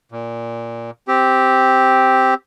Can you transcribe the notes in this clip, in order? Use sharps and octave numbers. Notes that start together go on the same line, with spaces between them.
A#2
C4 G4